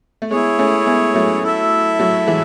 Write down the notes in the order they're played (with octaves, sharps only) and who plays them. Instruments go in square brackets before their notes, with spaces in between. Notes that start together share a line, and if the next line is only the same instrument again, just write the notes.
[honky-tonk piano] A3
[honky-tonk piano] G#3 B3 [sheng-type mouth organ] E4 G#4 C#5
[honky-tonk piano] A3 C#4
G#3 B3
F#3 A3
[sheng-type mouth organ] E4 A4 E5
[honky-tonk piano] F#3 A3
E3 G#3